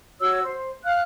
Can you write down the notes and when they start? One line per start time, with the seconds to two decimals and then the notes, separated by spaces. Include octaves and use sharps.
0.21 F#4 C#5 E6
0.43 C5
0.85 F5 F6 F#6